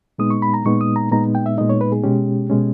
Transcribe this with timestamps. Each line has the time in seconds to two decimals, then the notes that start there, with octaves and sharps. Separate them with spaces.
0.18 A#2 G#3 B3 D#4 D#6
0.30 C#6
0.42 B5
0.54 A#5
0.65 A#2 G#3 B3 D#4 C#6
0.81 D#6
0.96 A#5
1.12 A#2 G#3 B3 D#4 A#5
1.35 G5
1.46 E5
1.57 A#2 G#3 B3 D#4 D#5
1.69 C#5
1.81 B4
1.92 G#4
2.04 B2 G#3 C#4 G4
2.50 B2 G#3 C#4